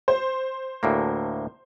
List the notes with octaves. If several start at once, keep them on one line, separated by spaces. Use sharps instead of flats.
C5
D2 A2 A#3